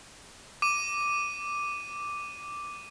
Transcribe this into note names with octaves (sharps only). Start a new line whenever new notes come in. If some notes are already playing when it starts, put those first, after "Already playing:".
D6 D#7